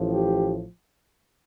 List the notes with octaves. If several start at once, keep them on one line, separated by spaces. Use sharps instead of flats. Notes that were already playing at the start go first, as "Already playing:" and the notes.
Already playing: A1 A2 F3
G4